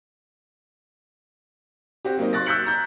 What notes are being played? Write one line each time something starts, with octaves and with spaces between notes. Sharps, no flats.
C4 F#4 G4
F#3 A#3 C4 D#4
C6 C#6 F#6 A6 A#6
E6 F#6 G6 B6 C#7 F#7
A#5 G6